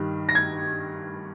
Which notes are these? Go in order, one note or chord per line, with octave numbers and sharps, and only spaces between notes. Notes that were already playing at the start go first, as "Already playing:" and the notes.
Already playing: G2 D#3 G3
A#6
G#6